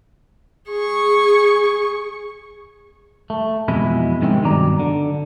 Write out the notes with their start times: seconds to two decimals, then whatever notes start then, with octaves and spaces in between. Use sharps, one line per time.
0.69 G#4 C#6
3.30 A3
3.68 F2 B2 E3 G#3 E4
4.22 G#2 C3 D#3 G#3 C4
4.43 G2 B2 D#3 F#3 D5 A#5
4.80 D3